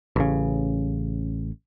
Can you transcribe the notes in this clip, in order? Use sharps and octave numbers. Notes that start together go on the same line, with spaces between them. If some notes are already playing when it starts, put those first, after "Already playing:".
A1 C#3